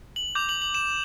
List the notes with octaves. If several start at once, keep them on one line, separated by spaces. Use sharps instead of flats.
F#7
D6 G6 F7
F#7
F#7
E7